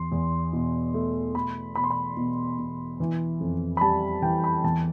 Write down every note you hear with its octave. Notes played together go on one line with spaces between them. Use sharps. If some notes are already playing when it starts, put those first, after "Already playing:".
Already playing: E2 C6
E2
B2
A3
A3 B5
B2 B5
C6
B5
B2
B2
E3
F2
B5
G3 A5
E3 G5
B5
E2 A5